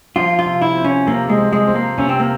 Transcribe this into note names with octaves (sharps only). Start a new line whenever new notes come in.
F3 F4
F4
C3
E4
C4
C#4
C3 A#3
G#3
C4
G#3
C4
A#3
C3 C#4
C4
A#3